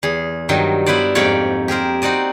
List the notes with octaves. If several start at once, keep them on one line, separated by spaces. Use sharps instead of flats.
E2 G#4
G2 D#3 F#3 D#5 G5
B3 E4 B4 C5 D5
F2 G#2 A#3 G4 C#5 D5
G4 G#4 A#4 C5
C4 D#4 F#4 D5 D#5